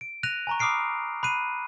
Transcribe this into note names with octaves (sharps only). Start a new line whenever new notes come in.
D7
F#6 A#6 D#7 F7
G#5 A#5 C#6
B5 D6 D#6 F6 C7 D7
B5 F#6 C7 D#7